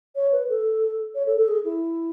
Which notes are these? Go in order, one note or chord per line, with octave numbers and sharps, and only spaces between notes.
C#5
B4
A4
C#5
A4
A4
G#4
E4